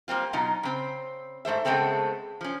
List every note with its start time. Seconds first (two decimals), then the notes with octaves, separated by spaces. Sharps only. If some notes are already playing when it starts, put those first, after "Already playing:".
0.08 G3 A#3 C4 F4
0.33 B2 F#3 D#4 F4 A#5
0.63 C#3 C4
1.45 G#2 A3 C5 E5
1.65 C#3 G#3 A3 B3 C4 A4
2.41 F3 C#4